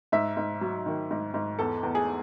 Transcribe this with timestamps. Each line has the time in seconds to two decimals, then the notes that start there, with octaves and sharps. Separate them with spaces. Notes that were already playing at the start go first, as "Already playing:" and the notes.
0.12 G#2 E5
0.37 G#2
0.61 F#3
0.86 D#3
1.11 G#2
1.34 G#2
1.59 E2 A4
1.83 E2
1.95 G#4